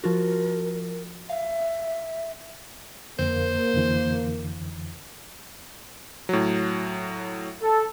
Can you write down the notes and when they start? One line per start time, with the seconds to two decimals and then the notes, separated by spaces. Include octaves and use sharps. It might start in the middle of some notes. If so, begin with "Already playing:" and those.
0.04 F3 F4 F#4 A#4
1.30 E5 F5
3.19 F2 D3 A#3 C5
3.74 F2 D3 E3
6.29 A2 F#3
7.62 A4